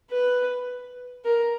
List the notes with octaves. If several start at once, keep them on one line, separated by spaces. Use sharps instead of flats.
B4
A#4